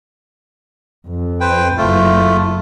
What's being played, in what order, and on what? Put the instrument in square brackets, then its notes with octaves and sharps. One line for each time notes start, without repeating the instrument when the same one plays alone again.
[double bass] F2
[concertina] B4 C5 G5
[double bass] F#1 E4 [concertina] A3 F4